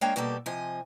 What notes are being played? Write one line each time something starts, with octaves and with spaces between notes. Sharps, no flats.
G#3 A#3 D4 C#5 F5 G5
B2 G3 A#3 G4 A4
C3 F3 D#5 G#5